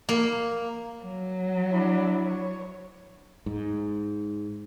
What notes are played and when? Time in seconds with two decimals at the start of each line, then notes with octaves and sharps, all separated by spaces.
0.09 A#3
1.03 F#3
1.70 D4 E4
2.24 C#5
3.46 G#2